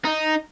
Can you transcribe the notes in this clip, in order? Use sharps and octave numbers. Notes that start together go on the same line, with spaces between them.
D#4